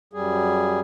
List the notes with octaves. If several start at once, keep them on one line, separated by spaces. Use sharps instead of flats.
F#2 G3 G#4